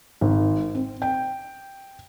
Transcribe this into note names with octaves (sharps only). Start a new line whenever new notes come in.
G#1
C4
G5